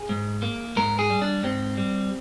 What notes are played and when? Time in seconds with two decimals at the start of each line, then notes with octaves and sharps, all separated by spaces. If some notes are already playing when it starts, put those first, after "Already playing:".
Already playing: G#4
0.09 G#2
0.43 A#3
0.76 G#2 A#4
0.99 G#4
1.10 G3
1.22 D4
1.43 G#2 C4
1.77 G3